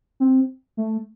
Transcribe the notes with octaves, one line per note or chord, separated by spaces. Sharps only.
C4
A3